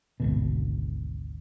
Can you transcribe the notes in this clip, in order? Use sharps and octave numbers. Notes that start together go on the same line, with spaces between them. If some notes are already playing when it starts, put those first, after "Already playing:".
G#1 D2 B2